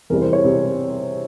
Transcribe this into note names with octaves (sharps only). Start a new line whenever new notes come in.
E2 C3 G3 A#4
C5
C#5
C3 G3